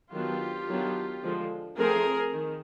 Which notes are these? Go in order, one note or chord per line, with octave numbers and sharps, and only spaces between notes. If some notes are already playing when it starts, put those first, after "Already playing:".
D#3 F#3 B3 D4 F4 G4
D#3 F#3 B3 D4
D3 F3 G#3
F3 A3 C4 G#4 A#4
D#3